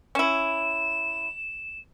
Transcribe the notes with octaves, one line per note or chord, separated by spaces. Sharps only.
C#4 E4 E7